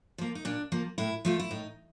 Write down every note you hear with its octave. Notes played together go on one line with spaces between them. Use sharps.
F3 A#3
D#4
A#2 D4
F3 A#3
A2 E4
F3 A3 F4
E4
A2 D#4